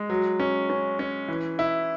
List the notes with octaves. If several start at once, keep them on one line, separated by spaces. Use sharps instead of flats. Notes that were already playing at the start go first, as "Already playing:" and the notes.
Already playing: G#3
F#3
C#4
C#4
C#4
E3
E4